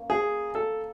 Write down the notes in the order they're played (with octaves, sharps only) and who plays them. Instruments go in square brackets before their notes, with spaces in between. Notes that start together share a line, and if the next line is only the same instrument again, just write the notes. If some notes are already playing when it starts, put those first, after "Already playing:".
Already playing: [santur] A#3 C#4
[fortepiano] G#4
A4